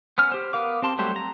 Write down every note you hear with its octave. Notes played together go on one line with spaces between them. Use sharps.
B3 C#4 F6
G4 C5
B3 A#4 F5 D6
C4 G4 A5 C6
F#3 G3 A3 G4 C5
A#5